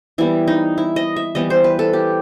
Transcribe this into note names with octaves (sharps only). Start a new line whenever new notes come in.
E3 G3 B3 E4
D#4
E4
D#5
E5
E3 G3 B3 D#5
C5
B4
A4
G4